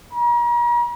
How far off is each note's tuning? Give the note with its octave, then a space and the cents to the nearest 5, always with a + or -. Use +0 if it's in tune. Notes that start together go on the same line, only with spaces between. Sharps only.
A#5 +40